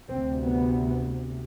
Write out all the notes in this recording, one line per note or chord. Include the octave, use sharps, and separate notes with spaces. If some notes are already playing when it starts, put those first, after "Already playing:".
D2 C3 C4
B3